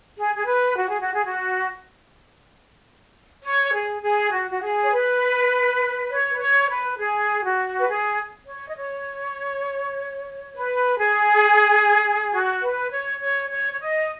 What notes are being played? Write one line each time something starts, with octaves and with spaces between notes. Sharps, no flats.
G#4
G#4
B4
F#4
G#4
F#4
G#4
F#4
C#5
G#4
G#4
F#4
F#4
G#4
C#5
B4
C#5
B4
C#5
B4
G#4
F#4
B4
G#4
C#5
D#5
C#5
B4
G#4
F#4
B4
C#5
C#5
C#5
C#5
D#5